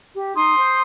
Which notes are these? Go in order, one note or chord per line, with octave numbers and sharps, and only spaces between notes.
G4
D#4 C6 D#6
C5